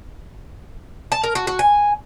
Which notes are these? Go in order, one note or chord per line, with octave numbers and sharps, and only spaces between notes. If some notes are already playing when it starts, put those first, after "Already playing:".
A5
A#4
F#4
F#4
G#5